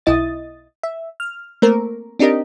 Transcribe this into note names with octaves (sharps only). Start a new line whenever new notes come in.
B1 E4 D#5 D#6 A6
E5
F6
A3 A#3 C4 A#4
C4 D4 D#4 G4 A#4 D#5